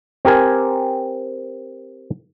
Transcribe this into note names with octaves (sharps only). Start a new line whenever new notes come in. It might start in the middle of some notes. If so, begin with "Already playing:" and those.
C4 G4 A#4 G#5